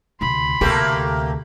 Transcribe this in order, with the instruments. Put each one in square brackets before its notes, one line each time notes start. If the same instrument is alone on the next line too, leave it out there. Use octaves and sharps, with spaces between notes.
[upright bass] D2 C3 [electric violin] B5 C6
[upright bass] D2 C3 [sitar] A3 A#3 G4